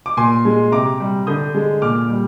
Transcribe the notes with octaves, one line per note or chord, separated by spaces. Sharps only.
D6
A#2 G#5 C6
G#3
C3 A#5 D6
G3
D3 D#6 G6
G#3
A#2 D6 F6
G3